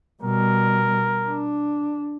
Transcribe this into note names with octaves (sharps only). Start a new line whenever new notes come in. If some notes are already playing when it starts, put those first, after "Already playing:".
B2 G3 A#4
D4